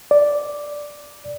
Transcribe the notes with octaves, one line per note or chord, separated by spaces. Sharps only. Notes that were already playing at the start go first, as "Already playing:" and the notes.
D5